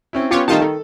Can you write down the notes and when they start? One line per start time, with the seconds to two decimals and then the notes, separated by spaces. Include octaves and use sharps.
0.13 C4 C#4 E4
0.31 B3 C#4 F4 G4 C#5
0.48 D#3 G3 A3 D#4 F4 A5
0.61 D#3 A4